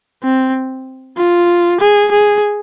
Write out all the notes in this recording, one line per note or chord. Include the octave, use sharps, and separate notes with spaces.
C4
F4
G#4
G#4